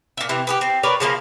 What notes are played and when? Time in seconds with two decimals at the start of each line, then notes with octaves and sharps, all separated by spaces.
0.17 A#2 E5
0.29 C3 E3 C4
0.47 G4 G#4 B4
0.61 C4
0.83 A#4 B4 C#5 D5
1.00 C#3 F3 A#3 E4